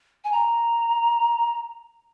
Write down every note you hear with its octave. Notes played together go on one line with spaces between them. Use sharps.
G#5
A#5